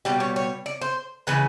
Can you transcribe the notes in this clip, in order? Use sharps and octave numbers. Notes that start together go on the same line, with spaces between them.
B2 G3 G4
C#5
C#5
D5
C5
C#3 E3 G#3 B4